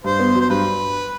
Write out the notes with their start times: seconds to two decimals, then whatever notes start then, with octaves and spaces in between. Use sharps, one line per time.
0.04 G2 C5
0.19 B3
0.35 F#3
0.40 C5
0.50 G2 B4